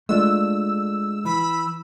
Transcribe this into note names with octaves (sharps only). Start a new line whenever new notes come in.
G#3 A3 D4 F4 E6
E3 B5